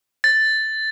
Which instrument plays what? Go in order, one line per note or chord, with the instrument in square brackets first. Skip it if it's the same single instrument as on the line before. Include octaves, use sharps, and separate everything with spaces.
[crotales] A6